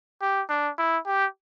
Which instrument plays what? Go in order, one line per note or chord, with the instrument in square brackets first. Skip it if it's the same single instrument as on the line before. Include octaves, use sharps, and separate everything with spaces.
[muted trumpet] G4
D4
E4
G4